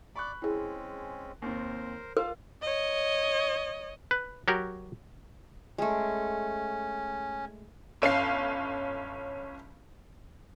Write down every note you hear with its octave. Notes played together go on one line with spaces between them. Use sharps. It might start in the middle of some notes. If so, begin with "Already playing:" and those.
D5 B5 C#6 D6 F#6
G#3 C4 C#4 E4 G#4
D#2 C4 A#4 C5
F4 A#4 F5
C#5 D#5
B4
F#3 F#4 G4 A#4
G#3 A3 C#4
G1 C#4 F5 C7